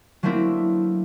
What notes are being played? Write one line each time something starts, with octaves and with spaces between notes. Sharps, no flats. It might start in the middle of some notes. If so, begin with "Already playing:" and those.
F#3 A3 A#3 C4 D4 E4